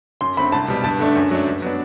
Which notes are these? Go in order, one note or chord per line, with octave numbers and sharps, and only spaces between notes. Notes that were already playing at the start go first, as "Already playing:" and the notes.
F#2 C6
D3 A3 C4 B5
C2 A5
B2 G3
G2 A5
D3 A3 D4
F#2
F#3 A3 D4
G2
F#3 B3 D4